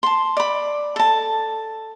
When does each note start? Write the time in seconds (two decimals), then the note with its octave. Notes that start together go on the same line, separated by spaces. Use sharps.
0.03 A5 C6
0.37 D5 B5
0.96 A4 A5